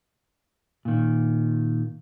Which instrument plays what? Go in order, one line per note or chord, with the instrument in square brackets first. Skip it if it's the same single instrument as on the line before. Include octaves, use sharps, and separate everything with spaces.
[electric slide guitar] A#2 D#3